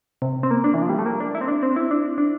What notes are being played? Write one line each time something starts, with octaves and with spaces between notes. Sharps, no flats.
C3
C4
A#3
D4
E3
F3
G3
A3
A#3
D4
E4
C4
D4
C4
E4
D4
D4